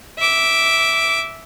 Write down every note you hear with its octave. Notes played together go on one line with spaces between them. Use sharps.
E5 D6